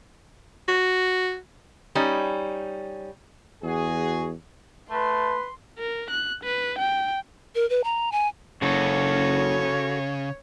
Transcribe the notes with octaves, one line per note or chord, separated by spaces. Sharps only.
F#4
G3 C#4 D#4
E2 F#4 G#4
A3 B4 C6
A#4
F#6
B4
G5
A#4
B4
A#5
G#5
F#1 C#3 F#4 A4 C#5